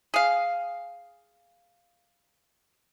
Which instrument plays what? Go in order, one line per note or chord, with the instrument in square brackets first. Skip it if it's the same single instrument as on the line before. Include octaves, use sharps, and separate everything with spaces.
[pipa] G#4 F5